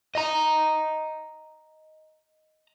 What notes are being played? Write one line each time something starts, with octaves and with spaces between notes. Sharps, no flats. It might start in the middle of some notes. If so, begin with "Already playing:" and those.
D#5 A#5